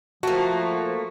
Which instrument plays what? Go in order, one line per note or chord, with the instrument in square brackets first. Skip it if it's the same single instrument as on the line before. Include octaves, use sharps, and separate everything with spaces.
[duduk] F3 [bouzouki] A3 A#3 [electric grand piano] F#4